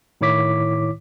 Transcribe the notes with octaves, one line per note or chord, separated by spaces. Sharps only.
A2 D#3 E4 C#5 D6 B6